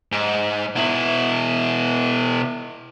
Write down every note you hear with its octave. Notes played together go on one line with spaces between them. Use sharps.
G#2
B2 E4